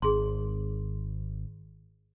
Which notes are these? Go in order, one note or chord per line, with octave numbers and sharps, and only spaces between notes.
G#1 G#4 C6